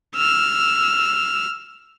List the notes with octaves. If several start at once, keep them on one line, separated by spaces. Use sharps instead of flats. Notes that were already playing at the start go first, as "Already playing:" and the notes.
E6 F6